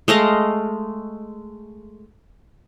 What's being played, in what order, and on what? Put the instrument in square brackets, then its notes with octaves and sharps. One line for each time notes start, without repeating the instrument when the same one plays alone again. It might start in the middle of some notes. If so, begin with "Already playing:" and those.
[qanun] G#3 A3 D#5 F5